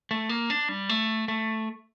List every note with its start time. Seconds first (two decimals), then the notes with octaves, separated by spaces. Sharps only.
0.11 A3
0.29 A#3
0.50 D4
0.69 G3
0.89 A3
1.28 A3